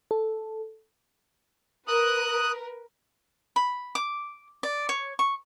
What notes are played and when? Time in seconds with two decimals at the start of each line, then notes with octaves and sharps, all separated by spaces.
0.11 A4
1.88 A#4 B4 D#6 F#6
3.56 B5
3.95 D6
4.63 D5
4.89 C#5
5.19 C#6